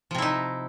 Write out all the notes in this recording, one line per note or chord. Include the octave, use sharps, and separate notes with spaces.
C3 F3 D#4 E4